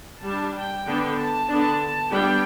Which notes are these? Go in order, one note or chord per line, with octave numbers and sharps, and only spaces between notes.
G3 D4 A5
G5
D3 B3 D4
A5
D3 B3 D4 A5
G3 B3 D4 G5